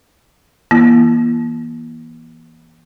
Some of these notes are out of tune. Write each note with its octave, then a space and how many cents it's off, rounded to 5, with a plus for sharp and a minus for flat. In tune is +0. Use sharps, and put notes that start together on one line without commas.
E3 -10 A#3 +40 E4 +40